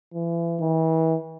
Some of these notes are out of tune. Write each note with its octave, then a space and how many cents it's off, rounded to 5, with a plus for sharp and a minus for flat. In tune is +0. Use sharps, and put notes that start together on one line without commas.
E3 +35
E3 -35